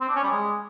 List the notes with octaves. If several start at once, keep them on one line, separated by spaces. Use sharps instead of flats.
C4
D4
C#4
G3
G#3